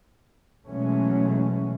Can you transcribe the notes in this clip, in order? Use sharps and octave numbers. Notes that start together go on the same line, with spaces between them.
B2 E3 F#3 G#3 A3 C#4